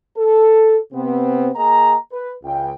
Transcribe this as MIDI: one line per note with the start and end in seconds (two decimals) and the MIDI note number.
0.16 0.77 69
0.93 1.50 48
0.93 1.50 59
0.93 1.50 60
1.55 1.95 58
1.55 1.95 68
1.55 1.95 75
1.55 1.95 82
2.13 2.33 71
2.44 2.72 37
2.44 2.72 79